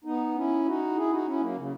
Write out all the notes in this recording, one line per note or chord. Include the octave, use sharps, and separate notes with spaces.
B3 D#4
C#4 E4
D#4 F#4
E4 G#4
D#4 F#4
C#4 E4
F#3 A#3
C#3